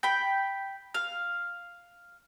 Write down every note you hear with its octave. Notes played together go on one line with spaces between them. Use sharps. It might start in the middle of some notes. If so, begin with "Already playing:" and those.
G5 B5
F5